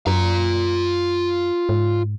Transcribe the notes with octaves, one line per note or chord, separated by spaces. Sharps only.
F#2 F4 A#5
G#2